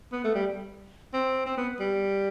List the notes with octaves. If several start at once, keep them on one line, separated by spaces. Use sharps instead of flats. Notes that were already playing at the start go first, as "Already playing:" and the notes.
B3
A3
G3
C4
C4
B3
G3